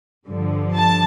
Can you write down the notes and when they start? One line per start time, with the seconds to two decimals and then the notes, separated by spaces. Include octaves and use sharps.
0.27 G2 D3 F3
0.75 A5